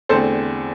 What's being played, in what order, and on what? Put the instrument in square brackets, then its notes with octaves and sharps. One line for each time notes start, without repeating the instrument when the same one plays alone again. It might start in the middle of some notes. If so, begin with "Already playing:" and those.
[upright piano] E2 D3 A3 C4 A4 C5